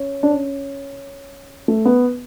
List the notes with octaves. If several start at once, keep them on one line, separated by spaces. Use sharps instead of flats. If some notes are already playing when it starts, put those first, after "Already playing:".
Already playing: C#4
D4
C#4
A3
B3